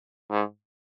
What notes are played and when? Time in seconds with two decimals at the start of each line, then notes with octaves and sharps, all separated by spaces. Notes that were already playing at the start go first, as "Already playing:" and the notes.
0.30 G#2